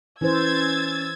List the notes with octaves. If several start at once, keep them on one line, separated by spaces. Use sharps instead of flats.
E3 C#4 C5 E6 G#6 A6